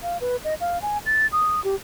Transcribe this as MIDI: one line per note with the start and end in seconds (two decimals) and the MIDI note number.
0.03 0.18 77
0.21 0.36 71
0.44 0.54 75
0.61 0.80 77
0.82 0.98 80
1.06 1.27 93
1.32 1.62 87
1.64 1.75 67